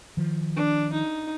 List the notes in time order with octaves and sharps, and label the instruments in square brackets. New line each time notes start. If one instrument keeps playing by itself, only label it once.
[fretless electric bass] D#3 F3
[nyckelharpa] D4
D#4